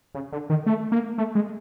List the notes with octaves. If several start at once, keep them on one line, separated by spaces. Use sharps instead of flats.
C#3
D3
D#3
A3
A#3
A3
G#3